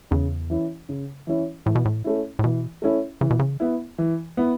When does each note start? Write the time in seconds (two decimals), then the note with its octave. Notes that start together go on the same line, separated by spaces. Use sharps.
0.11 E2 C#3
0.50 E3 C#4 E4
0.89 C#3
1.27 E3 C#4 E4
1.66 A2 E3
1.75 B2
1.85 A2
2.04 A3 C#4 E4
2.39 A2
2.44 B2 E3
2.82 A3 C#4 E4
3.21 C#3 E3
3.30 B2
3.39 C#3
3.60 B3 E4
3.98 E3
4.37 B3 E4